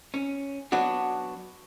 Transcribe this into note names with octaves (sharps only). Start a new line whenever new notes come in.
C#4
F#3 B3 D4 F#4